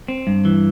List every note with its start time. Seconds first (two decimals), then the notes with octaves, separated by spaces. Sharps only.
0.08 C4
0.27 G2
0.45 E3